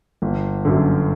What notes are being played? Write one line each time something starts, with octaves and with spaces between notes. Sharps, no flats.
G1
F#2 D3